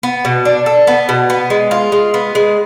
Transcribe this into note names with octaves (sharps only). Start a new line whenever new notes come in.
B3
B2
D4
A4
B3
B2
B3
G#3
F4
G#3
B3
G#3